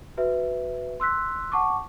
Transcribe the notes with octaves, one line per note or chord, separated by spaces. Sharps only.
F#4 B4 E5
C6 E6 F#6 B6
F#5 A5 C#6 D6